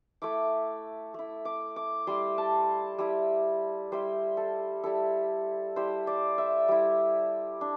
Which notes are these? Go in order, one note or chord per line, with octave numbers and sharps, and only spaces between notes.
A3 E4 D6
A3 E4
D6
D6
G3 E4 C6
A5
G3 E4
G3 E4 C5
A4
G3 E4 A4
G3 E4 C5
D5
E5
G3 E4
D4